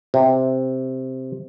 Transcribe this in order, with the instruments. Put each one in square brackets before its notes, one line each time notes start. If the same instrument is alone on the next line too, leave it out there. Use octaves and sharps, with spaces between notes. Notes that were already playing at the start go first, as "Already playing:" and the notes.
[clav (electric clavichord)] C3